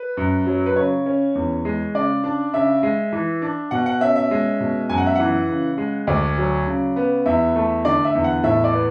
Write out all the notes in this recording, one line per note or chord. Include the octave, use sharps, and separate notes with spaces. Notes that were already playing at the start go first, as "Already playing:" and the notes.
Already playing: B4
F#2
F#3
B4
C#3 C#5
C#4
E2
G#3
C#3 D5
D4
C#3 E5
G#3
E3
D4
B2 F#5
F#5
C#4 E5
E5
G#3
B2
F#2 G#5
F#5
E5
E3 F#5
C#3
G#3
D2 D5
F#3
C#3
B3
E2 E5
A3
D3 D5
E5
E2
F#5
A2 E5
D5
B3